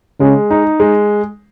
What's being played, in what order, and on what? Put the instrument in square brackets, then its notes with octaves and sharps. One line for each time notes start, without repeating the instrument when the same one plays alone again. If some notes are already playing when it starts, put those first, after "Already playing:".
[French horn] C#3 [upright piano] G#3
[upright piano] D#4
G#3